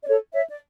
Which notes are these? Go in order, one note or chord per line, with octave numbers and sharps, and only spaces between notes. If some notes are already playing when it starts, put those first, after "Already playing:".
D5
A4 C#5
C#5 E5
D5